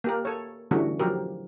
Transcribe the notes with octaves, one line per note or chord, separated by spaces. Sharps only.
A#3 G4 A#4
A4 C#5
D3 E3 G3 A3 C#4 F#4
F3 F#3 G4 A#4